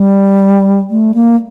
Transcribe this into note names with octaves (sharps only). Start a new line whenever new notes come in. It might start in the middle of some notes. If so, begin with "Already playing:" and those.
Already playing: G3
A3
A#3